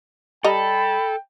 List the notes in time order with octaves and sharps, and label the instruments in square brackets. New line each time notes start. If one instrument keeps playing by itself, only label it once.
[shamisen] G3 D#5 A#5 [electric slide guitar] A4 [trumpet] G5 [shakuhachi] B5